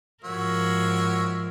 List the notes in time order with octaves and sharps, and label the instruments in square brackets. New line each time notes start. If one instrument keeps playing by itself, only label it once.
[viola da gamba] G#2 F3 A#4 [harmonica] F#4 C#5 E5